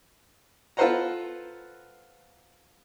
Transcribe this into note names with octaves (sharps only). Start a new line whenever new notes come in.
F4 A4 B4 C5 F#5 A#5